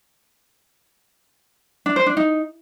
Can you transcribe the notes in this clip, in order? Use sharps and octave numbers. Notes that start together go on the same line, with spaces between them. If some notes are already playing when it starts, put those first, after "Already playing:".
D4
C5
D4
D#4